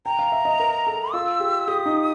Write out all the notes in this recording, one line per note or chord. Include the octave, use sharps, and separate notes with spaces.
G5 A#5
F5
E5
D#5
A#4
A4
F4 E6
G4
G4 D#6
D#4